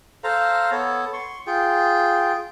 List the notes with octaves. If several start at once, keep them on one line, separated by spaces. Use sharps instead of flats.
A4 C5 F5 A#5
B3 A4 C#5
C6 C#6
F4 G#4 G5